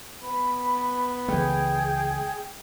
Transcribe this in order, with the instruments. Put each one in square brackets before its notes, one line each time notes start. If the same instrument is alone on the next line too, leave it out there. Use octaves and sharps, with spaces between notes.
[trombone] B3 [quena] B5
[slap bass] C#2 E3 A3 [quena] G#4 [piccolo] G5